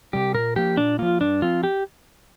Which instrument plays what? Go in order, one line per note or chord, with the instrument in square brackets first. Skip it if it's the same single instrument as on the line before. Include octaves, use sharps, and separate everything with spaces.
[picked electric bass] C3 G3 [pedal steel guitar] G4
[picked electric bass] A#2 [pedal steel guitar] A#4
[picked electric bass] F3 A#3 [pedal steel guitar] G4
[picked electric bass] A#2 [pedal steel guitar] D4
[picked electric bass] F3 A#3 [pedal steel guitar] F4
[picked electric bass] G2 [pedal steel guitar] D4
[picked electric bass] F3 C4 [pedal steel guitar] F4
[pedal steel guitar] G4